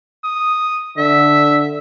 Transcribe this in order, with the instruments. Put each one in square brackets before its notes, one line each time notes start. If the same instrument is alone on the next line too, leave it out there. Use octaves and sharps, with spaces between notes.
[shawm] D#6
[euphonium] D3 [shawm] E5